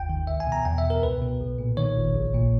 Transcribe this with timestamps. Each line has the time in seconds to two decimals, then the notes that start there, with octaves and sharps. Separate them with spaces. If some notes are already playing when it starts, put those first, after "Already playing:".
Already playing: G1 D#2 G5
0.09 D#3
0.27 C#2 E5
0.40 G#5
0.47 B2
0.52 A#5
0.65 E2 G5
0.78 E5
0.84 B2
0.90 A#4
1.03 C#2 B4
1.22 B2
1.41 B1
1.59 A#2
1.77 D#3 C#5
1.97 G1
2.15 A#1
2.34 A#2